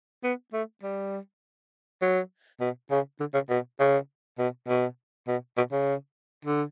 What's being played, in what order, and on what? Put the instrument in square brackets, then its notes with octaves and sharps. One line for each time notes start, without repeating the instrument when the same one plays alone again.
[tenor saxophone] B3
A3
G3
F#3
B2
C#3
D3
C#3
B2
C#3
B2
B2
B2
B2
C#3
D3